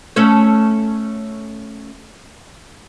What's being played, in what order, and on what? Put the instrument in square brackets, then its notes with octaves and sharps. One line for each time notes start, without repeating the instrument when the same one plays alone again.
[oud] A3 C#4 C#5